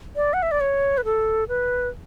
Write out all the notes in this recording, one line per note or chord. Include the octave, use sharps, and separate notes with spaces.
D5
F#5
E5
D5
C#5
B4
A4
B4